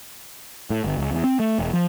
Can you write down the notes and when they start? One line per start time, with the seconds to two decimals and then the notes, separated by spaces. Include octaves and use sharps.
0.70 A2
0.84 G1
0.98 C#2
1.11 E2
1.24 C4
1.40 A3
1.59 E1
1.73 F3